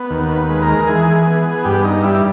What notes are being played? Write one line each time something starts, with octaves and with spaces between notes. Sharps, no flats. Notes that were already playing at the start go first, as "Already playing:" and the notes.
Already playing: B3
D#2
B4
G#3
A#4
E3 G#4
B3
G2 G4
D#4
G3 E4